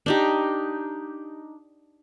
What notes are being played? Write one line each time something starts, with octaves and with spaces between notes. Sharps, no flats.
D4 D#4 G4